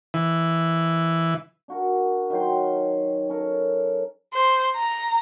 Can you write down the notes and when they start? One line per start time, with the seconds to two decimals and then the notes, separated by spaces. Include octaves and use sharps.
0.14 E3
1.68 D4 F#4 A#4
2.30 D#3 F#3 G5 C6
3.29 C#4 A4 A#4
4.33 C5
4.76 A#5